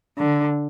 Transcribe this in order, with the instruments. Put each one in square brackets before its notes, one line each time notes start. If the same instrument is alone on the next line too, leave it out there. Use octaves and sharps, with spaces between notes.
[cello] D3